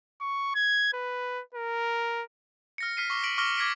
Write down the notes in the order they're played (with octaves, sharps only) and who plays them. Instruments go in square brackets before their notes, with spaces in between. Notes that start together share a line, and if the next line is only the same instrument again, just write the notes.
[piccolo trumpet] C#6
G#6
B4
A#4
[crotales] F6 A#6 C#7
F6 B6 C7 D#7
C#6 D6 G7
A#6 B6 D7 F#7
C#6 D6 F6 A#6 G7
D6 F6 G#6 A#6 B6 D7